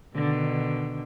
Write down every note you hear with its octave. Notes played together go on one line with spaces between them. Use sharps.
B2 D3 D#3